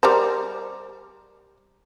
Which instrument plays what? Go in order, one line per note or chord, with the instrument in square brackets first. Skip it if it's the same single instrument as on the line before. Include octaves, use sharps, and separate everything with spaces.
[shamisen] G3 A#4 C5